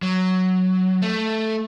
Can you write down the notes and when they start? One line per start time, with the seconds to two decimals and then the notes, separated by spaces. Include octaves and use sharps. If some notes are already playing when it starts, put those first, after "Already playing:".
0.02 F#3
1.02 A3